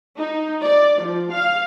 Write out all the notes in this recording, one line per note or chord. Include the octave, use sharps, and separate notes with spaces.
D#4
D5
F3
F5